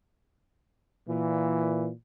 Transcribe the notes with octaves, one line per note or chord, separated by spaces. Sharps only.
A#2 E3